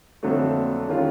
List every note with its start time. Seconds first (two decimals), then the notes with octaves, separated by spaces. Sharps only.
0.23 F2 D3 F#3 A3
0.88 D#3 G#3 C#4 F4